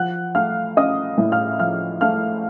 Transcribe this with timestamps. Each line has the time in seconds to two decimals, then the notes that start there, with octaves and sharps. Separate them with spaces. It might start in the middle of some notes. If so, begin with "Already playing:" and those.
Already playing: F3 F#5 F#6
0.35 A3 F5 F6
0.76 C#4 D#5 D#6
1.18 A2
1.32 F5 F6
1.59 F3 F5 F6
2.01 A3 F5 F6